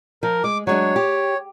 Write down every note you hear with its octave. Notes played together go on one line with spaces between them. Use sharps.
F3 A#4
G#3 D6
F#3 G#3 D4 C#5
G4